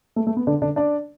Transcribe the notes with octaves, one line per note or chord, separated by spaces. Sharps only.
A3
A3
B3
D3 D4
D3 D4
D4 D5